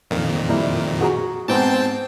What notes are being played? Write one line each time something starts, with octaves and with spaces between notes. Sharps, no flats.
F2 A#2 D#3
G3 A#3 E4
F#4 G#4 A#5
G#2 B3 C4 G5 A5